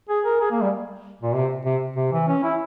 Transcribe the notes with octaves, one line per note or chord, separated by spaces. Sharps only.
G#4
A#4
G#4
A#3
G3
A#2
C3
C3
C3
E3
C#4
E4